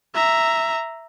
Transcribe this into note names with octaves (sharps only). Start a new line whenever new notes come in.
E5 A#5